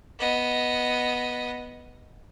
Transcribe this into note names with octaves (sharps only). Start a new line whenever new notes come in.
B3 D#5